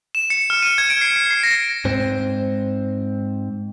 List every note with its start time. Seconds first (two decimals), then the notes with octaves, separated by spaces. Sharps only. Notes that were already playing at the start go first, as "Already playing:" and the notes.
0.15 E7
0.30 C#7
0.50 F6
0.62 D#7
0.78 G#6
0.90 D7
1.01 C7
1.16 C7
1.31 C7
1.43 A#6
1.85 G#2 C4